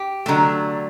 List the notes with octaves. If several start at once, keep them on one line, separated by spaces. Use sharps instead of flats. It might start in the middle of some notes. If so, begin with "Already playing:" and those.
Already playing: G4
D3 F#3 A3